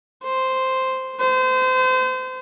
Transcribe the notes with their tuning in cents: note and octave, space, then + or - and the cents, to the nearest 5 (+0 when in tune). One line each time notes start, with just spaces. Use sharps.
C5 -5
C5 -30